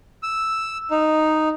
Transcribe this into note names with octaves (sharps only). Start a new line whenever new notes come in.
E6
D#4